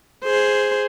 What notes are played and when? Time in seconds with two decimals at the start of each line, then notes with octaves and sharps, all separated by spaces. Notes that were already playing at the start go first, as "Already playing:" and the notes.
0.24 G#4 C5